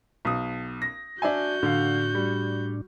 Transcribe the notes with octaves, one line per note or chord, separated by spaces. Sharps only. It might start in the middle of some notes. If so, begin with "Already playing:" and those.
B1 D#6
A#6
D4 F#4 E5 G#5 G6
A2 D3 D4 F5
G3